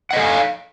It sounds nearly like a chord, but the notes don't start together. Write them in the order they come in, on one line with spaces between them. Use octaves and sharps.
F#5 D#5 A4 G#5 F5